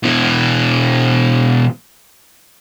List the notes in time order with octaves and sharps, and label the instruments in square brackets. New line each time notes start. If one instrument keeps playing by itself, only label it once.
[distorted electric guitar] B2 E3